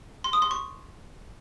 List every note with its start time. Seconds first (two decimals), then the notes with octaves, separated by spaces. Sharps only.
0.24 C6
0.33 D#6
0.42 C6
0.51 C#6